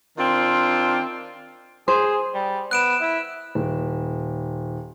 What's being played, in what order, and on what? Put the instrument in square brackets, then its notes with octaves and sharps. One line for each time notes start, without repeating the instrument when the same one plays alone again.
[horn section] D#3 C4 D4 F4
[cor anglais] G#4 [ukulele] C5
[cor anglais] G3
[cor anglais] B3 [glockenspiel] F#6 D7 E7
[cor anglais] E4
[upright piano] D#1